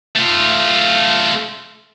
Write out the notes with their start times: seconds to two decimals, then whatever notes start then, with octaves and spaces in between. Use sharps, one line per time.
0.16 A3 F4